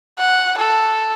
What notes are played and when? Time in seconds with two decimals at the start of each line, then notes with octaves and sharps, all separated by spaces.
0.18 F#5
0.58 A4